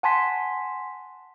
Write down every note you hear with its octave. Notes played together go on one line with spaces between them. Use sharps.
F#5 G#5 A5 C6 B6